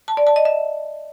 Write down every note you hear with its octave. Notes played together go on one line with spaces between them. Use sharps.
A5
D5
A5
D#5
E5